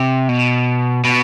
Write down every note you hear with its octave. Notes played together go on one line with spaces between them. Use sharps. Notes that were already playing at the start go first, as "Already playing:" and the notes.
Already playing: C3
B2
B2